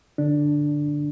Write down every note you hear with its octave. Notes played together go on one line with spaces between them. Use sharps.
D3 D4